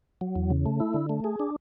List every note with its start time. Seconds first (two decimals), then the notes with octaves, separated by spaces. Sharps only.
0.21 F#3
0.35 E2
0.50 C#3
0.66 A3
0.80 E4
0.94 D3
1.09 A3
1.24 G#4
1.40 D4